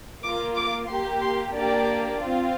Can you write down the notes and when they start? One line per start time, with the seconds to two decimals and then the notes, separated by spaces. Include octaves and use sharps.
0.23 A#3 F4 D6
0.56 D6
0.89 A#3 G4 C6
1.21 C6
1.54 A#3 D4 G4 D5
2.19 C4 F4